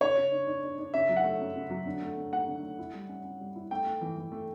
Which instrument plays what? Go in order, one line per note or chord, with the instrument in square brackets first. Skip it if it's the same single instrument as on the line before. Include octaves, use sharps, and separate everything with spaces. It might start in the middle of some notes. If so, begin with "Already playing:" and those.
[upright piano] C#3 [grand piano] C#5
[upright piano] C#3
D4
D4
D4
D4
[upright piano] C#3 [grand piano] E5
[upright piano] F#3
[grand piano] F#5
[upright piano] A3
F#2
C#3
F#3
D3
A3
D3
[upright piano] A3 [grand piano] F#5
[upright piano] D3
A3
E4
G3
C#4
C#4
G3
E4
[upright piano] A3 [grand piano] G5
[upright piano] A3
E3
E3
A3